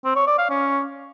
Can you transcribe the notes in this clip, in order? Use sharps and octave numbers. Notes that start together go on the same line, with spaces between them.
C4
C#5
D5
F5
C#4